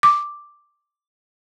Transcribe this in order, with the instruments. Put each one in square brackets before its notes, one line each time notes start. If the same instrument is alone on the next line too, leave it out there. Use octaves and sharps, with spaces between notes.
[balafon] D6